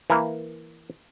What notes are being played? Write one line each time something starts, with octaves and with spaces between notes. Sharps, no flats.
E3 A#3